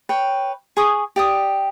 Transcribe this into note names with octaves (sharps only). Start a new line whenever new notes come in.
B4 C#5 G5
G#4 C#6 D#6
G4 D5 D#6